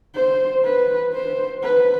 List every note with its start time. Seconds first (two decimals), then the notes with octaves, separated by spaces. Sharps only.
0.15 C5
0.64 B4
1.13 C5
1.62 B4